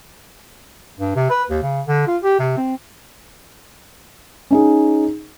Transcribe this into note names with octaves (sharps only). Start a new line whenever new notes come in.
G2
C3
B4
D#2
C#3
D3
F4
G4
C3
C4
C#4 D#4 G#4